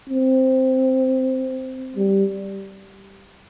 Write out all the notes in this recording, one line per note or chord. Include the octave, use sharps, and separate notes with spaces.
C4
G3